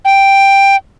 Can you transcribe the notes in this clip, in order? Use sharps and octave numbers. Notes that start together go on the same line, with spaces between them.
G5